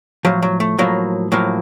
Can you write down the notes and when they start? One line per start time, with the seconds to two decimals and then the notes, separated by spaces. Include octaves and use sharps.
0.25 A2 F3 F#3
0.42 F#3
0.60 A3
0.78 A2 F3 F#3 A#3
1.32 A2 F3 F#3 A#3